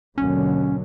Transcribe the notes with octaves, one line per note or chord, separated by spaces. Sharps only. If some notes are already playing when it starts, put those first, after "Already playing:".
G#1 D#2 B2 D3 F#3 C#4